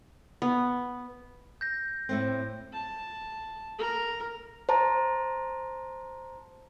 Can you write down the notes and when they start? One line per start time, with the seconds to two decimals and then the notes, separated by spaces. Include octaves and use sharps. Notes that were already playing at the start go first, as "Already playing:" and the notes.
0.42 B3
1.61 G6 A#6
2.09 A2 A3 C4
2.73 A5
3.78 A#4
4.69 C5 A5 A#5